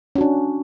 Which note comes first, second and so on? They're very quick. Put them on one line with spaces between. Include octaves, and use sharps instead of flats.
C#4 F#4 D4